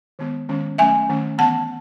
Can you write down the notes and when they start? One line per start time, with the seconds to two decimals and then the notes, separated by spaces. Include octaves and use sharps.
0.19 D#3 G#3 B3
0.49 D#3 G#3 C#4
0.78 F#3 A3 C#4 E5 G#5
1.09 D#3 A3 C#4
1.38 E3 B3 F#5 A5